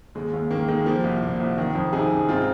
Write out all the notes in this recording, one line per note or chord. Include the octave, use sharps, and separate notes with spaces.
D#2 G#3
D#2
D#3 A#3
D#3 G#3
F3 A#3
C2
A#2
C2
D#3
F2
C3 D#4 G#4
F2
G#2 C4 F4